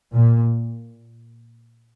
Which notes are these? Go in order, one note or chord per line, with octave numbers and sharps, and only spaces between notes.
A#2